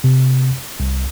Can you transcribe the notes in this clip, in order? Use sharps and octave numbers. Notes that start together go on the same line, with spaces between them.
C3
C2